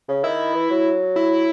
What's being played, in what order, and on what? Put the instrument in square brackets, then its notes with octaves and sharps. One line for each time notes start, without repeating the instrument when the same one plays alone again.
[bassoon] C#3
[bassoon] D#3 [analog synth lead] E4
[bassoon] E3
F#3
[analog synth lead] E4